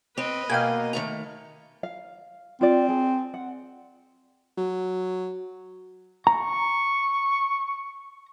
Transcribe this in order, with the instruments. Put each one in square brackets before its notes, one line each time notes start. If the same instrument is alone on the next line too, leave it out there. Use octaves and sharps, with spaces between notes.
[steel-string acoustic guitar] C4 [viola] B4 D#5
[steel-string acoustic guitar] B2 [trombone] A#3 [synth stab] F5 G5 G#5
[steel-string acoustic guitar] D#3 A3 A#5
[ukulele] F5
[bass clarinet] C4 [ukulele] F4 D5
[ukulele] G#4
F#5
[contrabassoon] F#3
[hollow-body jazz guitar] A#5 [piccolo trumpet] C#6